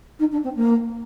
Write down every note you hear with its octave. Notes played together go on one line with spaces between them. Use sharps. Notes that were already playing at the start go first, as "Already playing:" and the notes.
D#4
D4
C4
A#3